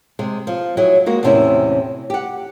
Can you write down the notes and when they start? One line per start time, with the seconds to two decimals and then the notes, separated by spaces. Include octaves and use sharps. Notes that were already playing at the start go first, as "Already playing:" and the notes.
0.19 C3 G#3
0.47 F3
0.77 F#3 E4 G#4
1.06 G#3 A#3 F#4
1.23 E2 A2 C3 C#4 E4
2.10 G4 F#5